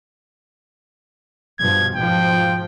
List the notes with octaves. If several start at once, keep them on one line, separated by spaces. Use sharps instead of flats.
G2 B2 F3 G#6
G#2 B2 F3 G5